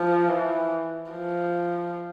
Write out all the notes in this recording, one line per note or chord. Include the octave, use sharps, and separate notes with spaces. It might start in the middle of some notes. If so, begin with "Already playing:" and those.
Already playing: F3
E3
F3